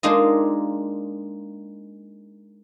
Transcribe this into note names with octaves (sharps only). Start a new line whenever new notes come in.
G#3 A#3 D4 D#4 F4 D#5